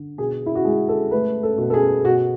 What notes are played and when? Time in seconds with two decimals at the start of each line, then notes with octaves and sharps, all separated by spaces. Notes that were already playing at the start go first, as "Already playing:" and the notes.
Already playing: D3
0.18 B2 G#4
0.46 E4
0.55 F#4
0.65 G#3 G#4
0.89 A4
1.11 A3 B4
1.43 A4
1.58 B2
1.70 A4
1.74 G#4
2.04 B2 F#4